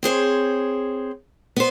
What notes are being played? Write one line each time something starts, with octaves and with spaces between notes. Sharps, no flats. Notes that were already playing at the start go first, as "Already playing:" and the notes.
C4 G#4 C5 C#5
B3 C5